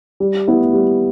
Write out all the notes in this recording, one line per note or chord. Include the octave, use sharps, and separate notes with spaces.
G3
B3 E4 B4
G3